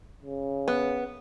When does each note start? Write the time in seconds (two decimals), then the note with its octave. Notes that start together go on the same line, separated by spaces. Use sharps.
0.22 C#3
0.68 B3